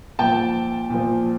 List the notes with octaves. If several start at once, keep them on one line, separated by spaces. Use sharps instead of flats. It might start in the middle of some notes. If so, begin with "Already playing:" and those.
A#2 F3 G5 A5
A#2 F3